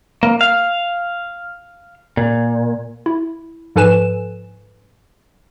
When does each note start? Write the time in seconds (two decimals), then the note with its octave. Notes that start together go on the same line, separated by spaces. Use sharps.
0.23 A#3
0.41 F5
2.17 A#2
3.06 E4
3.76 G#2 F3 A4 B4 G#5 E7